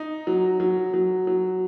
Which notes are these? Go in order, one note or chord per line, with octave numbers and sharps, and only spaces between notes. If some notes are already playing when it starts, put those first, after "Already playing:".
Already playing: D#4
F#3
F#3
F#3
F#3